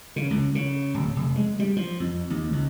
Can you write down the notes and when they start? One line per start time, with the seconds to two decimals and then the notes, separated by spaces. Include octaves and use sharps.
0.16 C#3
0.31 C#2
0.55 C#3
0.94 D1
1.16 F1
1.36 G#3
1.60 G3
1.77 F3
2.00 F2
2.30 D#2
2.53 C#2